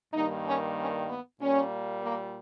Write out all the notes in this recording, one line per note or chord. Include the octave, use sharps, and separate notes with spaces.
G2 D#3 G3 A#3 D#4
C#4
C#4
B3
A#2 G3 A#3 C#4
A#3